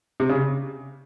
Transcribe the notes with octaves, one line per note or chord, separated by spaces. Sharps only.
C3
C#3